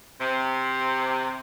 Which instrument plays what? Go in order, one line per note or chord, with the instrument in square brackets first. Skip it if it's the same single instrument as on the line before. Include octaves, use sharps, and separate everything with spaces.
[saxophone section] C3